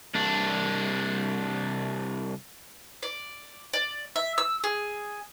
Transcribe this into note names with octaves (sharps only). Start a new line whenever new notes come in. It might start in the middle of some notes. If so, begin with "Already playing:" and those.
C2 D4
D5
D5
E5
E6
G#4